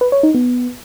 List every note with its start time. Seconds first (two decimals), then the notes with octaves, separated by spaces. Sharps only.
0.01 B4
0.12 C#5
0.23 D#4
0.35 B3